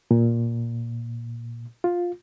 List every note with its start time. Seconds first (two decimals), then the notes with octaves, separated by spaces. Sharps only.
0.11 A#2
1.84 F4